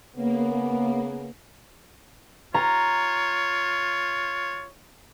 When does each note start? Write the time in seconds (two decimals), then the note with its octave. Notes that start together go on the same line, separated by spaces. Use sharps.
0.16 C#3 A#3 B3
2.54 F4 C#5 A#5